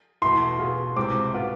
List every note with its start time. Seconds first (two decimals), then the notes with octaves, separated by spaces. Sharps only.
0.22 E2 B2 A3 E4 C6
0.59 B2 B3 F4 G#4
0.96 C2 C3 G#3 C4 D6
1.34 B2 B3 F4